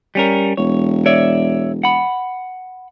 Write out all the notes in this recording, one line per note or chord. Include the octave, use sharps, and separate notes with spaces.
G3 C#4 A#4
E1 C#5
C#5 D5 E5
F#5 B5